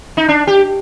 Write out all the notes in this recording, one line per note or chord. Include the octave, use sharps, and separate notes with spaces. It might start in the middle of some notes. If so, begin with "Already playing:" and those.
D#4
D4
G4